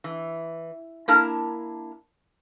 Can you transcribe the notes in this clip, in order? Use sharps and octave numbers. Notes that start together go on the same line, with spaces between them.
E3
A#3 D4 E4 A#4 A5 A#5